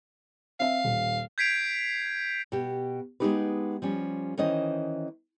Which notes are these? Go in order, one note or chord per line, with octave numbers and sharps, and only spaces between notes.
C4 E5 F5
D#1
G6 G#6 B6 C7 D7 F7
B2 G4
G#3 B3 C#4 D#4 G4 B4
F3 G3 C#4
D#3 E3 C#4 C5 D#5